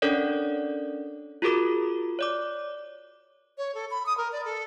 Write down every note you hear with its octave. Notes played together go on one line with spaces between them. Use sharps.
C#4 D4 A4 A#4 C#5 D5
F4 F#4 G#4 A#4 D6
C#5 D5 D6
C#5
A4
B5
D#6
A#4
D5
A4